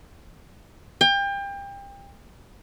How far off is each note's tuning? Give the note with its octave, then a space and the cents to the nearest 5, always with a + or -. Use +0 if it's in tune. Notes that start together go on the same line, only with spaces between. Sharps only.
G5 +30